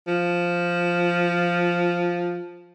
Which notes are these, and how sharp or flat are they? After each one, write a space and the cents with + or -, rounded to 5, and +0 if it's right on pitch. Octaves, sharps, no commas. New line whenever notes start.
F3 +0